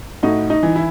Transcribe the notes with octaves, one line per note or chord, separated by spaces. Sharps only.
A2 D#4 F#4
D#4
E3
E4